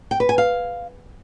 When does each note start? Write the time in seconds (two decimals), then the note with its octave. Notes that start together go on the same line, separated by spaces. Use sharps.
0.11 G5
0.20 B4
0.29 G#5
0.38 F5